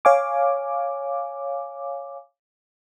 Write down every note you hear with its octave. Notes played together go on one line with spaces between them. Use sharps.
C#5 F5 G#5 D6